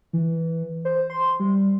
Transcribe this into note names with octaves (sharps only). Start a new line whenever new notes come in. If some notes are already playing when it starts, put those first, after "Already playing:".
E3
C5
C6
G3